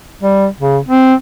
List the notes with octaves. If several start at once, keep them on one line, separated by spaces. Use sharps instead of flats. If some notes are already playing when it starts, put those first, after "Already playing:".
G3
C#3
C4